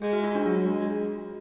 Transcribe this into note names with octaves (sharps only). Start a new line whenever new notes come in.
G#3 G#4
F#4
F4
D4
F#3 F4
G#3